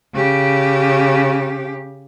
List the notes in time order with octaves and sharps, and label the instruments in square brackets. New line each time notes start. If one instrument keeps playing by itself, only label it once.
[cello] C#3 G4